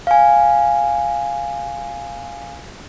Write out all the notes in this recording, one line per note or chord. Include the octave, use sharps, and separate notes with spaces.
F5 G#5